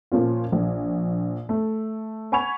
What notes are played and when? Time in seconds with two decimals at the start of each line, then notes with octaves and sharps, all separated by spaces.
0.12 A#2 F3 C#4 F4
0.52 A#1
1.49 A3
2.32 F#5 G#5 B5 C#6 G#6 F7